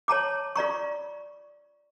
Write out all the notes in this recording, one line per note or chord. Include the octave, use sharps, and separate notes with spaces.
C#5 A5 A#5 D6
F4 D5 A#5 C#6